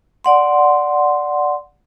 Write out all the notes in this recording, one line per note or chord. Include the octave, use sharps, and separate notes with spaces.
D5 F#5 C6